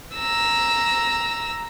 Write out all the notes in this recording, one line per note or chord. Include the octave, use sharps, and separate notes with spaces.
A#5 E6